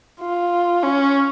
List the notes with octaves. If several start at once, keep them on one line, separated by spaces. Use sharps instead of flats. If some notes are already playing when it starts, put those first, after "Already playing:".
F4
C#4